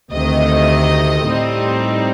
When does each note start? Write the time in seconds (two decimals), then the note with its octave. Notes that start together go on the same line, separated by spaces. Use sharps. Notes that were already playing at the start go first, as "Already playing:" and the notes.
0.12 D2 C3 D#3 A3 D#5
1.28 A2 G3 C4 D#4